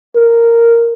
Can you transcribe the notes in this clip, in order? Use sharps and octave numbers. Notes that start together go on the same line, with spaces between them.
A#4